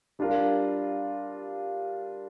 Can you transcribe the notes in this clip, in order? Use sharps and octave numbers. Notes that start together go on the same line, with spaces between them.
G3 D4 F4 A#4